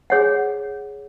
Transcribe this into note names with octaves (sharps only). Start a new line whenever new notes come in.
G#4 C#5 F#5